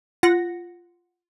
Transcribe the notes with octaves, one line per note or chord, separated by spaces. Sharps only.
F4 F#5 A#6